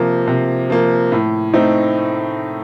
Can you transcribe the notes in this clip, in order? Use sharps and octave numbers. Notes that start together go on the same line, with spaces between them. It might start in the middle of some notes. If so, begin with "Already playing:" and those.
Already playing: C3 F3 A#3
C3
F3 A#3
A2
A3 C4 D#4